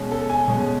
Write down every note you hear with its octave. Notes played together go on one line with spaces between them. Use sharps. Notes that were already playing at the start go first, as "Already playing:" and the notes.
Already playing: B2 G#3 C#4
A4
G#5
B2 G#3 C#4